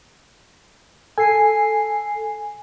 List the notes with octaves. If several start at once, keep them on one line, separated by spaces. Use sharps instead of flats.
A4 G#5 C7